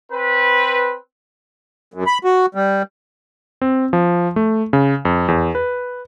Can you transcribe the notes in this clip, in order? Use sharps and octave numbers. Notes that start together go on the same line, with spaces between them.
C4 B4
F#2
B5
F#4
G3
C4
F3
A3
C#3
F2
E2
B4